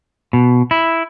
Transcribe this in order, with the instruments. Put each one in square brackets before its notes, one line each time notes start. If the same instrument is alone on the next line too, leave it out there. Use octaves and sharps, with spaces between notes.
[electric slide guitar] B2
E4